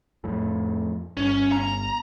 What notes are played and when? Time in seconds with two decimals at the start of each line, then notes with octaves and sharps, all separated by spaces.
0.24 F2 A2
1.17 G1 C#4
1.52 A#5